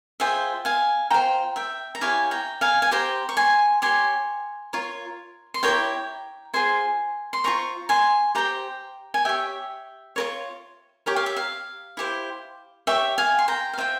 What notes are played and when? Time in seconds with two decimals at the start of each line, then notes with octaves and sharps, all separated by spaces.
0.20 F4 G#4 C5 E5 G5
0.65 F5 G#5
1.10 F4 C5 G5 A#5
1.56 E5 G5
1.95 A#5
2.01 E4 G4 C#5 F5 G#5
2.31 G5 A#5
2.61 F5 G#5
2.82 G#5
2.91 G4 C5 G5 A#5
3.29 C#6
3.37 G#5 C6
3.82 G4 C#5 G#5 C6
4.73 F4 A#4 C#5
5.54 C6
5.63 E4 G4 A#4 C#5 G5 A#5
6.54 F4 G#4 C5 G#5 C6
7.33 C6
7.44 F4 G#4 C5 A#5 C#6
7.89 G#5 C6
8.35 G4 C5 G5 A#5
9.14 G#5
9.25 G4 C#5 E5 G5
10.16 F4 A#4 C#5
11.06 G4 A#4 C#5 G5
11.16 F5
11.26 E5
11.36 F5
11.97 E4 G4 C5
12.87 G4 C#5 E5 G5
13.18 F5 G#5
13.39 C6
13.48 G5 A#5
13.73 F5
13.78 F4 C5 E5 G5